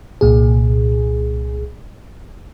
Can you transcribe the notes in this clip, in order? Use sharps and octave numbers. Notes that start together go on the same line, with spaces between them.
C2 A#2 G#4